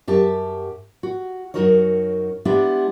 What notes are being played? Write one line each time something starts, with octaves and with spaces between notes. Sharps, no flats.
F#2 G4 E5 A5
F#4
F#2 C3 D#4 F#4 A#4 C#5
G#3 B3 D4 E4 G4